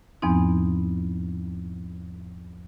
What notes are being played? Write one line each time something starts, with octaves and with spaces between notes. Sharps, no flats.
E2 G#2 F3 B3 C4 D#4